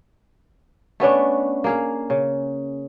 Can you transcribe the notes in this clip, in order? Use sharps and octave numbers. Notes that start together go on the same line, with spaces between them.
A3 B3 C#4 D4
A#3 G#4 F5
C#3